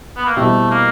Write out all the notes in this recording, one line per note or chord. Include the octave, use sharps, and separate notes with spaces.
B3
A#3
B2 G3 A3 C4 E4 G4
A#3